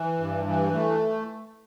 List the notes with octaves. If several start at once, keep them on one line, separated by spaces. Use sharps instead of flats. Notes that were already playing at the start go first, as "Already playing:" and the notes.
Already playing: E3
G2
E3
A3